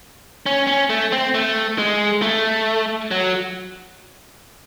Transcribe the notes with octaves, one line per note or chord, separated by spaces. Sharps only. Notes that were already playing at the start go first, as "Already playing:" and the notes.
C#4
C#4
A3
C4
A3
G#3
A3
F#3